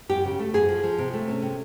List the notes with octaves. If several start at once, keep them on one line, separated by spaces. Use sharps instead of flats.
F#2 G4
C#3
A3
F#2 G#4
F3
F3
C3
A3
C#4
C3